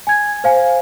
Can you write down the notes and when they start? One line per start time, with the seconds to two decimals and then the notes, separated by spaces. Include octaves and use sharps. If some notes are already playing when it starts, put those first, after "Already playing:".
0.07 G#5 G#6
0.44 C5 F5 G#5